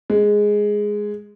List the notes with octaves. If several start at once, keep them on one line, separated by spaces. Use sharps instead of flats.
G#3